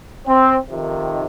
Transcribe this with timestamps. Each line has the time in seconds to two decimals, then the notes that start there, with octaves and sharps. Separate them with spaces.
0.28 C4
0.70 F2 C3 D#3